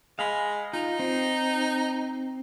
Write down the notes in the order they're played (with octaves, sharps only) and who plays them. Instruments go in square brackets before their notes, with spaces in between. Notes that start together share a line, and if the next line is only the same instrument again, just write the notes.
[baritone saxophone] G#3 [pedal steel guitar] F5 B5
[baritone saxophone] D#4 [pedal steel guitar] F4
[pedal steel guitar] C4